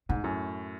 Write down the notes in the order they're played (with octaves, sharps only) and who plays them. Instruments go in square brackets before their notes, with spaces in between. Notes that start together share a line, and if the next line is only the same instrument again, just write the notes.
[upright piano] G#2 [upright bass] C#3
[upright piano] F#2 A2